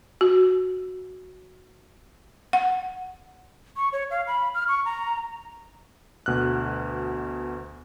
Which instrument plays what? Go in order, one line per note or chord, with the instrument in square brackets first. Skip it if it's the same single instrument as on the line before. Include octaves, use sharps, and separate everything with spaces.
[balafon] F#4
F#5
[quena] C#6
C#5
F5
B5
F6
C#6
A#5
[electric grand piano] D2 B2 F6 F#6